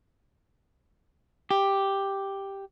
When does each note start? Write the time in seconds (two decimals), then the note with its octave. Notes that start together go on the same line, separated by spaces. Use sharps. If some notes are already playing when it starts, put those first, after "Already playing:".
1.51 G4